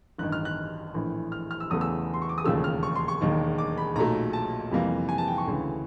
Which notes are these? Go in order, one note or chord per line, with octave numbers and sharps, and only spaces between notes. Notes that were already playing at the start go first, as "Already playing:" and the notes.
A1 G2 D#3 F#6
F6
F#6
A#1 A2 E3
F6
F6
E6
E2 C#3 E3 A3 D#6
E6
C6
C#6
D6
D#6
E1 D#2 C#3 F3 A3 E6
F6
C#6
C6
C#6
E1 D#2 D#3
D6
B5
B1 A#2 F#3 A3 A#5
A5
F2 C3 E3 G3 A#3
G#5
A5
G5
C#6
D2 C#3 E3